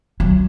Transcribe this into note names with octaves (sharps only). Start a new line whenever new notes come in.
F#3